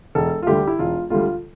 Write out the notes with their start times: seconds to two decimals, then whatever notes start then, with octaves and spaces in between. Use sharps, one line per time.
0.15 E1 A4
0.42 F4
0.47 D2 D3 G3 G4
0.67 E4
0.79 E1 F4
1.10 D2 D3 G3 F4